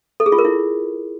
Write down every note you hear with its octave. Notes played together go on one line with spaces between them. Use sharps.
A4
G#4
F4
A#4
E4